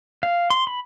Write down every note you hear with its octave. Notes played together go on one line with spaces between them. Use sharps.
F5
C6
B5